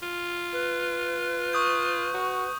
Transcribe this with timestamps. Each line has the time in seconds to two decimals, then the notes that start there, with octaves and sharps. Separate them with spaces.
0.03 F4
0.52 B4
1.53 C#6 D#6 G6
2.14 F#4